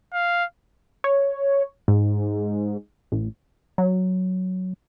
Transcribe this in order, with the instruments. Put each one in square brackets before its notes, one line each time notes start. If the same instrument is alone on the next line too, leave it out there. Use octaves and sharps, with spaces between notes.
[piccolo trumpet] F5
[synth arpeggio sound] C#5
G#2
A1
[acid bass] F#3